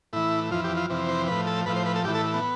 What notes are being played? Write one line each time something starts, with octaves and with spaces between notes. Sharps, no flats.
A2 E3 E4
F2 E3 F4
G4
F4
F2 C3 E3
C5
A2 F3 B4
A4
A2 F3 B4
C5
B4
A4
A2 E3 G4
A4
B3